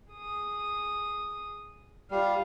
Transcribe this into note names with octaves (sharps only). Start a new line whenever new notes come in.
G#4 D#6
G3 F4 F5